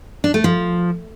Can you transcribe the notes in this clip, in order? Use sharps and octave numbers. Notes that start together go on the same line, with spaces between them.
D4
A3
F3